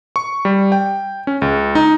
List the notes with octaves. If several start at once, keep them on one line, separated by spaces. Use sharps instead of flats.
C#6
G3
G5
C#4
C#2
D#4